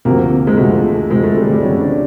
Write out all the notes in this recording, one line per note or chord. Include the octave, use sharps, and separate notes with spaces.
D2 C3 F3 A#3
G#3
D2 C3 F3 A3
D2 C3 F3 G#3
A3
G3
G3
D2 C3 F3 C#4
D4